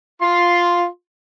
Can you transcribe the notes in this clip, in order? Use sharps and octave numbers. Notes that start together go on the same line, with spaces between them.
F4 C6